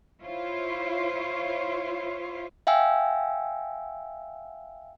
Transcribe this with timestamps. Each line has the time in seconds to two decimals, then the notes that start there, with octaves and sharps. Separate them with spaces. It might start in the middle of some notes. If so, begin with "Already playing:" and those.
0.22 E4 F4 C5 C#5
2.67 E5 F5 G5 G#5 E6